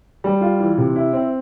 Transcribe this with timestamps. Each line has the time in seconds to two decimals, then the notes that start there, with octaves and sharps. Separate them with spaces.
0.24 G3
0.41 F4
0.60 E3
0.78 C3
0.96 E4
1.13 C4